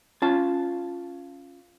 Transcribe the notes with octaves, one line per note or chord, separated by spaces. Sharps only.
C#4 F4 A5